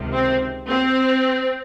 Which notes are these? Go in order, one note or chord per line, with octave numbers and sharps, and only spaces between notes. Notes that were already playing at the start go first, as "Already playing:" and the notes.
Already playing: C#2 C3 D#3
C4
C4